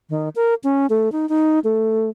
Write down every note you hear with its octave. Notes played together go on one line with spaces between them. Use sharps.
D#3
A#4
C#4
A3
D#4
D#4
A3